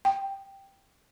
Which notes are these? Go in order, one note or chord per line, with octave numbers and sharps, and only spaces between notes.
G5